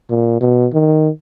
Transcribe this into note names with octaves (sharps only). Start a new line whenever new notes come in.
A#2
B2
D#3